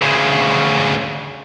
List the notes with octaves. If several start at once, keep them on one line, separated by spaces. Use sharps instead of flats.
D2 C#3